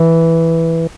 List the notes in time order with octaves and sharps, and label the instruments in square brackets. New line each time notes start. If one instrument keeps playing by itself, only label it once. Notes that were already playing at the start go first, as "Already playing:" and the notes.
Already playing: [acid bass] E3